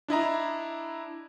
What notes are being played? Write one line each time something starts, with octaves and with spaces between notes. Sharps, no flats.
D4 E4 D#5 A#5